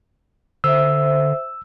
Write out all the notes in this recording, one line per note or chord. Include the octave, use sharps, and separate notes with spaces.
D3 C5 E5 E6